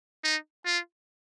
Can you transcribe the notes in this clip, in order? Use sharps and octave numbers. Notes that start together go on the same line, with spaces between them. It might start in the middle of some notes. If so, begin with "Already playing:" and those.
D#4
F4